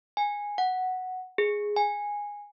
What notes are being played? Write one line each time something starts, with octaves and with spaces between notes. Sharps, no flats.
G#5
F#5
G#4
G#5